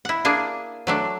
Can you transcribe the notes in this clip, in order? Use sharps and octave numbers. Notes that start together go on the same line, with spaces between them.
E4 F#5
A#3 D4 G#4
F#3 A3 D4